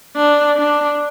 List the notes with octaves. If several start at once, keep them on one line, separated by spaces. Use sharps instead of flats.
D4
D4